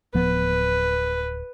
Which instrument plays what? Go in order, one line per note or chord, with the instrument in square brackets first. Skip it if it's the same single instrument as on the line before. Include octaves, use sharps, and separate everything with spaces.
[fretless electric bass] D1 F3 B3 [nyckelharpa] B4